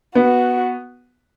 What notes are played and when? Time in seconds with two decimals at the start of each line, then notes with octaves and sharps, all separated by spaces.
0.15 B3 F#4